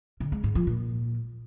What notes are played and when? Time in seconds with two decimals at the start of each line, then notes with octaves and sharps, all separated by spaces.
0.20 D3
0.32 G#3
0.44 G#2
0.55 F3
0.67 A#2